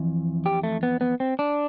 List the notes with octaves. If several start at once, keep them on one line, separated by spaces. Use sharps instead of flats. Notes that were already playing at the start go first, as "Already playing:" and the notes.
Already playing: F2 E3
G4
A3
B3
B3
C4
D4